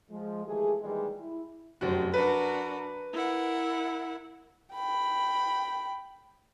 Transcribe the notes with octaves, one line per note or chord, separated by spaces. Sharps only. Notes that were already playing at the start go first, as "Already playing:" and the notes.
F3 G#3
D#3 E3 G#3 A3 G4 G#4
A#2 D#3 E3 G3 G#3
E4
F1 F#2 C4 F#4
D4 F#4 A#4 B4
E4 A#4 F#5
G5 B5